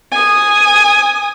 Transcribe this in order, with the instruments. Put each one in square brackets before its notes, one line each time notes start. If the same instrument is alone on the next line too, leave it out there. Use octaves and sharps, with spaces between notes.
[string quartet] G#5 D#6